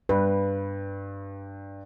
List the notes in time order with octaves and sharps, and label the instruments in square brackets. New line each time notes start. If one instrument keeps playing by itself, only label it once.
[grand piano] G2 [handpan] B4